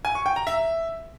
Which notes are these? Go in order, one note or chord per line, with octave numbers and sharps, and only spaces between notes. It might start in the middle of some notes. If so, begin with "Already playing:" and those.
G#5
C#6
G5
A#5
E5